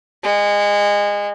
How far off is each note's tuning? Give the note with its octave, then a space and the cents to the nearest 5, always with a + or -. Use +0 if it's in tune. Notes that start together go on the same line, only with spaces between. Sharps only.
G#3 -25